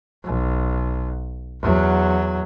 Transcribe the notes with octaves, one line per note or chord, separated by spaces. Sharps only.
B1
E2 F#3